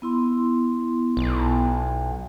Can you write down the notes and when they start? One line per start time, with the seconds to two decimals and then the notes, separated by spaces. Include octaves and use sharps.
0.02 B3 E4 C6
1.17 B1